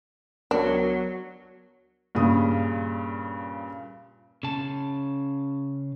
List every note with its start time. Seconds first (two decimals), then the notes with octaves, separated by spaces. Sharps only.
0.51 C#2 F#3 B3 D4 A#4
2.15 G2 A#2 C#3 D#6
4.43 C#3 A5